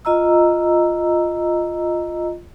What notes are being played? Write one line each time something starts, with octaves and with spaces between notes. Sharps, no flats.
F4 D#5 A#5 E6